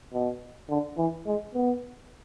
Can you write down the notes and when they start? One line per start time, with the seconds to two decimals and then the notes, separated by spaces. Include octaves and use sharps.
0.13 B2
0.69 D3
0.98 E3
1.26 G#3
1.54 B3